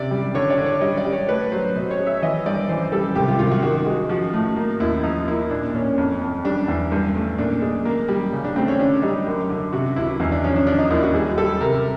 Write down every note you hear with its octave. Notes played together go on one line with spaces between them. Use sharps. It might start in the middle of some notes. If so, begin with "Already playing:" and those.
Already playing: C3 D5
G3
D3 C#5
D5
D3
C#5
G3 D#5
D5
G3
C#5
A2 B4
F#3 C5
B2 C5
C#5
G#3
E5
E3 D#5
G2 D5
E3 C5
G3 A4
C2 G4
F4
C2 F4
F#4
D#3 F#4
G#3
F3 F#4
A2
A#3
D#2 E4
F3 D#4
A#3 E4
A#2 D4
A#2 C#4
F2
F2
G3 D4
E2
G2
A3
A#2 D4
G#3
A#3
G3
C#3
D4
A3 C4
C#4
D3 D4
G3 D#4
F#2
D3
C3 F#4
C#2 E4
E2 D#4
D4
F3 C#4
D4
F3 D4
D#4
D#2 E4
F#4
G3 G#4
G3 A4
C3 A#4